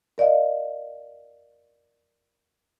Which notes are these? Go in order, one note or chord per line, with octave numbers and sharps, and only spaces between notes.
A#4 D5 D#5 F5